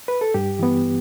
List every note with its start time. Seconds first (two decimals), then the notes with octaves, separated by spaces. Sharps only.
0.08 B4
0.21 A4
0.34 G2 G4
0.59 E3 B3